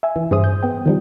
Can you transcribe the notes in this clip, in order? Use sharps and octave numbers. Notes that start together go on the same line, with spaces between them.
E5 G#5
E3
G2 G#4 C5 D#6
G6
B3 G5
D#3 F3 G3